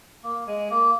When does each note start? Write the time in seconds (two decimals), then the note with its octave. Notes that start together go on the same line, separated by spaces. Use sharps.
0.23 A#3
0.47 G#3
0.70 A#3